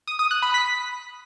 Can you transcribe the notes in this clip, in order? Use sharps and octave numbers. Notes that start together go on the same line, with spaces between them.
D#6
D#6
F#6
B5
B6